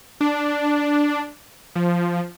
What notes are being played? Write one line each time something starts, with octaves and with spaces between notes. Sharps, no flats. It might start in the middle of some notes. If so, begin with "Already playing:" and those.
D4
F3